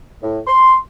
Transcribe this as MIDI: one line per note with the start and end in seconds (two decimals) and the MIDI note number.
0.23 0.39 45
0.47 0.77 84